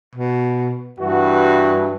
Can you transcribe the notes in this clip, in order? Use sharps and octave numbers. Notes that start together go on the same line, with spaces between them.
B2
G2 E3 F#4